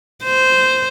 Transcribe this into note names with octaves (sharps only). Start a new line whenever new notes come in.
C5